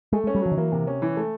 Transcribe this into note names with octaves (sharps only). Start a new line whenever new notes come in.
G#3 A3
G#3
C#4
G3
F3 F#3
D#3
E3 A#3
C3
C#4
E3
A3